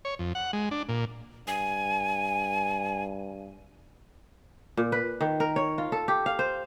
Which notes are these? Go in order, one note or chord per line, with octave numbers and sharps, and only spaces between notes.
C#5
F2
F#5
G#3
D4
A#2
G2 G#5
A#2
B4
D#3
A#4
C#5
F4
A4
G4
F5
C5